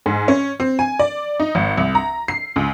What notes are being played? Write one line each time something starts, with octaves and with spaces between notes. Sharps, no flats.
G#2
C#4
C4
G#5
D5
D#4
G#1
C2
A#5
C7
C#2